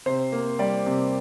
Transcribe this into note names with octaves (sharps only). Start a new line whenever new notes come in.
C3 C5
A#3
G3 D5
C3